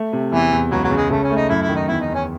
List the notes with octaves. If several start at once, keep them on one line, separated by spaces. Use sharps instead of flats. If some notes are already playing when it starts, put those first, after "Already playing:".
Already playing: A3
C3
E2 E3
E2
C#2 F#3
F#3
C#3
G#3
C#3 A3
C#4
A3
D#4
F#2 E4
E4
D#3
D#4
E2 E4
D#4
E2
C#4